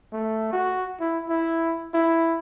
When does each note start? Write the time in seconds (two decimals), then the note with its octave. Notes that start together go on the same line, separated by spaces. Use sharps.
0.13 A3
0.53 F#4
1.00 E4
1.29 E4
1.94 E4